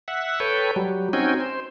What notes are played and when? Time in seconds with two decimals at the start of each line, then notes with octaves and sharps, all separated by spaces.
0.08 E5 F#5
0.40 A4 B4 C#5 G5
0.76 F#3 G3
1.13 C4 C#4 D#4 F#4 G5 G#5
1.40 C5